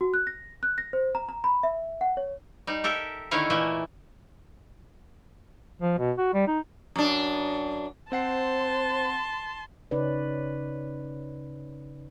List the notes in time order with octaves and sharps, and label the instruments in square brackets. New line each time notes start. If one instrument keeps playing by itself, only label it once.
[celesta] F#4
F#6
A#6
F#6
A#6
C5
A#5
A#5
B5
E5
F#5
C#5
[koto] G3 D#4
G4 A4 A#4 E5
D3 D#3 A3 E4 C#5 F5
A#2 E3 A3 A#3 E5 G#5
[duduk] F3
B2
F#4
G3
D#4
[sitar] F#2 D4
[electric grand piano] C4 F#5 C7 [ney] C5 [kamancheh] A5 C6
[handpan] C#3 C#4 D#4 B4 D5